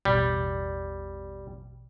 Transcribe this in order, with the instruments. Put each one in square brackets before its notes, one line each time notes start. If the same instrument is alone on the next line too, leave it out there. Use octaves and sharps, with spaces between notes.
[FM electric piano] A1 E2 B2 [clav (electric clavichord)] G3